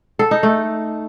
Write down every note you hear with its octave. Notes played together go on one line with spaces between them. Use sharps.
A4
D#4
A3